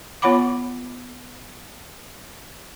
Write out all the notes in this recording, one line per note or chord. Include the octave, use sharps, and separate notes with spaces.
B3 F4 C#5 F#5 B5 D6